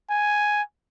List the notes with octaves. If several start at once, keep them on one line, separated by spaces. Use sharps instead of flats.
G#5